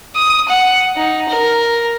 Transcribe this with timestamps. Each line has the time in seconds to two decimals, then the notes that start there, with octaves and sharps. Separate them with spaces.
0.15 D#6
0.48 F#5
0.96 D#4
1.28 A#4